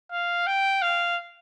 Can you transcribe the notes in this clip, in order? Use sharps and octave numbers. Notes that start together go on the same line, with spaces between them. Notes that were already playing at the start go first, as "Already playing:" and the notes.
F5
G5
F5